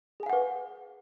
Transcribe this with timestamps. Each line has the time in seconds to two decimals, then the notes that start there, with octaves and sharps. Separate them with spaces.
0.20 G#4
0.23 G#5
0.26 F5
0.30 F#5
0.33 B4